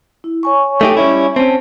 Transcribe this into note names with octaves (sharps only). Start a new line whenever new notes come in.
E4
C#5 G#5 C#6
A3 D#4 G4
G3 C#4 E4
C4 C#4 A5